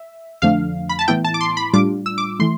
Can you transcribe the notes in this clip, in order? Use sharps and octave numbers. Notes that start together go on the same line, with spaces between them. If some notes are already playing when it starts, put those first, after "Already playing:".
Already playing: E5
F2 D3 F3 A3 D4 F5
B5
A5
A2 E3 B3 E4 G5
A5
D6
C6
B5
A2 G3 D4 F4 D6
E6
D6
E3 A3 C6